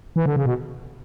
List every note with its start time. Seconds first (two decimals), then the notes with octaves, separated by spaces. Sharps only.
0.16 E3
0.26 D3
0.36 C#3
0.46 B2